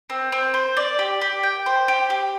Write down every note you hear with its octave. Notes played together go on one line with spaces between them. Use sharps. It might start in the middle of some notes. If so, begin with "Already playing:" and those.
C4
C4
C5
D5
G4
G4
G5
C5
G4
G4